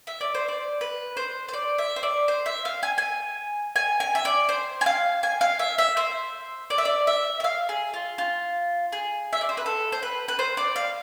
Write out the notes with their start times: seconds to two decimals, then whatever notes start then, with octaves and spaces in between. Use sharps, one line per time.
0.07 E5
0.21 D5
0.35 C5
0.48 D5
0.81 B4
1.17 C5
1.48 C5
1.53 D5
1.78 E5
1.96 C5
2.03 D5
2.28 C5
2.46 E5
2.65 F5
2.83 G#5
2.98 G#5
3.76 G#5
4.00 G#5
4.15 E5
4.25 D5
4.49 C5
4.81 G#5
4.86 F5
5.23 G#5
5.41 F5
5.59 E5
5.78 E5
5.97 C5
6.70 D5
6.78 E5
6.85 D5
7.07 E5
7.40 E5
7.44 F5
7.69 G#4
7.94 F4
8.18 F4
8.92 G#4
9.33 E5
9.41 D5
9.49 C5
9.57 B4
9.66 A4
9.92 C5
10.03 B4
10.28 B4
10.39 C5
10.57 D5
10.76 F5